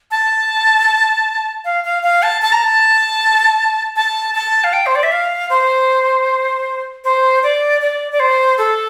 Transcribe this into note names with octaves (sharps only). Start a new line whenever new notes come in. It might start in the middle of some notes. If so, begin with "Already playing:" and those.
A5
F5
F5
F5
A5
A5
A#5
A5
A5
A5
F5
G5
C5
D5
E5
F5
C5
C5
D5
D5
D5
C5
A4